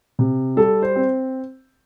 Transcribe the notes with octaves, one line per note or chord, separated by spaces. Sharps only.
C3
G3 A4
C5
C4